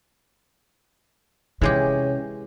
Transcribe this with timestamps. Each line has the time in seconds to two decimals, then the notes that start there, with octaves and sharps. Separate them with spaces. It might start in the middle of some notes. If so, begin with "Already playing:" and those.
1.61 C3 E3 G#3 C#4 G4 G#4 C#5